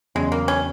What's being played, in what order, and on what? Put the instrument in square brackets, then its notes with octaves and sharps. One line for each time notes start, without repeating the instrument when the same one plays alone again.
[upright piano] E2 C#3 F#3 [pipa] G#3
[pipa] A#3
C#4